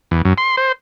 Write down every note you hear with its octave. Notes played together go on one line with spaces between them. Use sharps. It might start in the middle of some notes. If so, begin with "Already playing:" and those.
E2
F#2
C6
C5